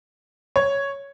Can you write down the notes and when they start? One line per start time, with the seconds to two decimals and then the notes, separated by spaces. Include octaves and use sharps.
0.56 C#5